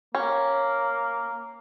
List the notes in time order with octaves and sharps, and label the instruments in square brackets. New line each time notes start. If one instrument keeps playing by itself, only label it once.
[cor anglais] A#3 [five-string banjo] C#4